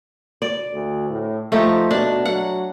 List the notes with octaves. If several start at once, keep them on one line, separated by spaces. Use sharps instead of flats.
D5
D2
A2
F3 A3 D#4 G4
B2 D4
F#3 F#5